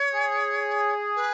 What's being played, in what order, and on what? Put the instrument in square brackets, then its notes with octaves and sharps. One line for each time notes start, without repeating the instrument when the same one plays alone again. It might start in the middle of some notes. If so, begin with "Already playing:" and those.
Already playing: [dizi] C#5
[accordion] G#4
[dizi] B4